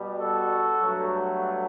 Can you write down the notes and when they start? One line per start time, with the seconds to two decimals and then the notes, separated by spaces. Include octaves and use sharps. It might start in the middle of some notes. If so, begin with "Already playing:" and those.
Already playing: B2 G3
0.18 F#4 A4
0.80 G2 F#3 A3